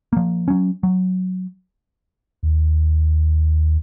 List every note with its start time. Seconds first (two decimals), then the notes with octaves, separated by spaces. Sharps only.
0.13 F3 A#3
0.48 F#3 C#4
0.83 F#3
2.43 D#2